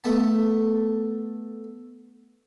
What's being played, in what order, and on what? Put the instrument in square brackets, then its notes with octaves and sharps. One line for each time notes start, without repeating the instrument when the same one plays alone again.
[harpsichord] A3 B3 A5